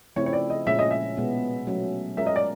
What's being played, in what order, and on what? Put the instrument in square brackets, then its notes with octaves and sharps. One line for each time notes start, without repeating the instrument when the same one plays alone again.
[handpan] C#3 F3 A3 C4 E4 [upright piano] C#5
[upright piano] C#5
D5
D#5
[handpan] A#2 F3 G#3 C#4 [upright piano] E5
[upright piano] D#5
E5
[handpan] B2 G#3 B3
F#3 A3 C#4
[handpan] G#3 C#4 F4 A#4 [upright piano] E5
[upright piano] D#5
D5